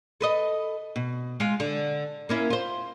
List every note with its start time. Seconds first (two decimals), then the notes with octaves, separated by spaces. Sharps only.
0.21 A4 B4 D#5
0.96 B2
1.40 G#3 F4
1.60 D3
2.29 A#3 C#4 E4
2.50 F4 C5